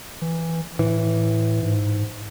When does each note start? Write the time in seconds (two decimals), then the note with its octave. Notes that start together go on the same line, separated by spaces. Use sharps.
0.22 E3
0.79 A2 E3
1.62 G#2